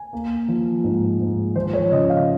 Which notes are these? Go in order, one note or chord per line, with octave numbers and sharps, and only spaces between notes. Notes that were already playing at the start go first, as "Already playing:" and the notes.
Already playing: G#5
A#3
F3
G#2
G#2
F3 C5
C#5
C#3 D#5
F5